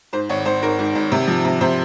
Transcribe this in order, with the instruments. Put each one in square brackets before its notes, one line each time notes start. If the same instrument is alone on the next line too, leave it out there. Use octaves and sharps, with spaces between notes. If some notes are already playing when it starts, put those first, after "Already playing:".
[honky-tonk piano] G#2 C5
G#1 C#5
G#1 C5
G#2 A#4
G#2
G#1
C3
F3
C3
C3 C5